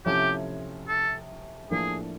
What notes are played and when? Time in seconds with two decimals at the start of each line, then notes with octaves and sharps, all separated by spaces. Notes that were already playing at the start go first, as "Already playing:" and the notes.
0.06 C3 F3 A3 C#4 E4 G4
0.88 A4
1.70 A2 F3 A#3 D4 G#4